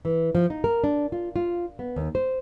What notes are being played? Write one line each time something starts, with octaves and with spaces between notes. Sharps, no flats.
E3
F3
D#4
A#4
D4
F4
F4
B3
D#2
C5